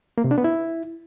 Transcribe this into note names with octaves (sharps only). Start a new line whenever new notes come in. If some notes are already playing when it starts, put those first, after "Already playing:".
A#3
C3
D4
B3
E4